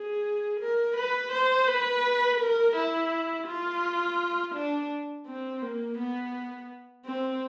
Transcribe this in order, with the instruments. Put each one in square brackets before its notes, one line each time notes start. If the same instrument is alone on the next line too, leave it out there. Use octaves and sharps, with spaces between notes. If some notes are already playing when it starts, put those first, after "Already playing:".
Already playing: [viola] G#4
A#4
B4
C5
B4
A#4
E4
F4
D4
C4
A#3
B3
C4